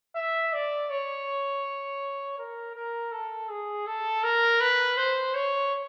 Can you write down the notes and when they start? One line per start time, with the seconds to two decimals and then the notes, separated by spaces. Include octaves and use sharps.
0.16 E5
0.53 D5
0.90 C#5
2.38 A#4
2.75 A#4
3.12 A4
3.49 G#4
3.87 A4
4.24 A#4
4.61 B4
4.98 C5
5.35 C#5